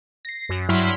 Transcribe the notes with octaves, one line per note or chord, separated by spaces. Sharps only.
A#6 C7
F#2
G2 F#3 E4 C6 F6 B6